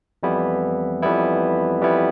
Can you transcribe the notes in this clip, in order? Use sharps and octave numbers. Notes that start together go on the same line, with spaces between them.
F2 E3 G3 B3 E4
F2 E3 G3 B3 E4
F2 E3 G3 B3 E4